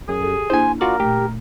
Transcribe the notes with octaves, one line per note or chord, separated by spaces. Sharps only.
F#2 G#4
G4 A4
A#3 D4 E4 C5 G#5
F4 F#4 A#4 D5
A#2 A3 G4